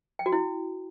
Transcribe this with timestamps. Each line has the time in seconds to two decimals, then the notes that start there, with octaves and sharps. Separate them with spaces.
0.19 G5
0.26 F#4
0.32 E4